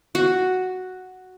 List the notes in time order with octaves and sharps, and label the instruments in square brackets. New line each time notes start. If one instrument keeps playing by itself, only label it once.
[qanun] F#4